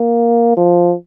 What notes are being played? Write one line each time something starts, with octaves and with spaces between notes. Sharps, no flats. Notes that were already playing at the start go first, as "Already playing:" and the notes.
Already playing: A#3
F3